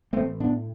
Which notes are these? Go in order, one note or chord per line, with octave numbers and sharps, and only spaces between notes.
A1 A3 C4
A2 B3 D4